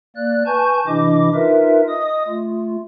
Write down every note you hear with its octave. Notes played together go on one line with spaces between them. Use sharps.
A#3 D5 F#6
B4 G#5 A5 C#6 G6
C3 E3 D4 E4 D#5 D6
D#4 F4 A#4 B4 E5
D#5 D#6
A3 F4